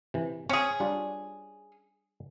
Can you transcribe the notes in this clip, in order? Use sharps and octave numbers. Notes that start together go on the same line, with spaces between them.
C3 E3
C4 C#4 G#4
G3 D4 F4